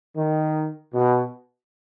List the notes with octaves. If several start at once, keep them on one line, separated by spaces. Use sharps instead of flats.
D#3
B2